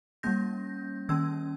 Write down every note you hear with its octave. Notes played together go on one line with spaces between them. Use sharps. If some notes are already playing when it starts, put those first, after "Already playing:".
G3 A#3 C#4 G6 A#6
D#3 A#3 C#4 E6 G#6